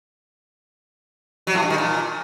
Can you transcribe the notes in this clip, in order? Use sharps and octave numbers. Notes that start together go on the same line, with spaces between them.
F#3
A2
G2
D#3
A#2